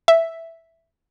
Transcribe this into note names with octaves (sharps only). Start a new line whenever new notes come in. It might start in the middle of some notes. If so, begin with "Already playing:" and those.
E5